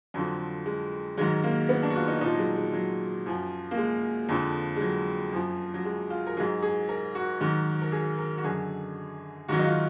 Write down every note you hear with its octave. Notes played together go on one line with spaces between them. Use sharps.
F2 D3 F3 F#3
G#3
G#2 D#3 F#3 G#3
A#3
B3
D4
F#4
F4
D#4
A#2 F3 D#4
F#3
G#3
G#3
F#3
F#2 F3
A#3
G#3
F2 D3 F3
G#3
F#3
F#2 F3
F#3
G#3
F4
A#4
G#2 F#3 G#4
G#4
A#4
F#4
G#2 D#3 F#3
A#4
G#4
A#4
F#4
F#2 D3 F#3 G#4
G#2 D#3 F#3 F#4
D#4
F4